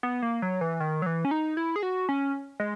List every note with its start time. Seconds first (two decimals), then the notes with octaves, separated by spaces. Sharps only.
0.03 B3
0.22 A#3
0.42 F#3
0.61 E3
0.80 D#3
1.02 F#3
1.06 E3
1.25 C#4
1.31 D#4
1.57 E4
1.76 G#4
1.83 F#4
2.09 C#4
2.60 G#3